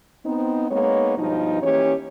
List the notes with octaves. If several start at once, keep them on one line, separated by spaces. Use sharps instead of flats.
B3 C4 D#4
G#3 A#3 B3 D#4 C#5
G2 B2 F3 D#4
E3 A#3 C#4 G4 C#5